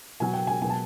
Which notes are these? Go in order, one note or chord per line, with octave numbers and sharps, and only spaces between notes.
B2 F#3 G#5
G5
G#5
B2 F#3 G#5
A5